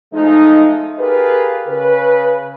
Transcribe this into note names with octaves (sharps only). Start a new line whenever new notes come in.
F3 G#3 A3 D#4
F4 G4 G#4 A#4 B4
C#3 B4